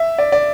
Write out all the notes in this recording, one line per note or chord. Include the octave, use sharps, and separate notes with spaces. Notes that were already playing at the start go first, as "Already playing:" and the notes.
Already playing: E5
D5
D5